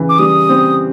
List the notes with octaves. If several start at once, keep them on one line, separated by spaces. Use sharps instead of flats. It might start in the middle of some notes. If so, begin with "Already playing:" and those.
Already playing: C#3 E3
D6
G3 D#6
C4